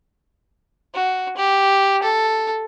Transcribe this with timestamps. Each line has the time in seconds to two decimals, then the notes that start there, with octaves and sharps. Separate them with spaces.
0.94 F#4
1.37 G4
2.03 A4